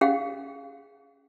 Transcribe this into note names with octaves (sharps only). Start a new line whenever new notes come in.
C#4 G#4 F5 F#5